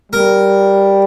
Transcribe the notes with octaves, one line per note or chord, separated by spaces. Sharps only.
G3 A#4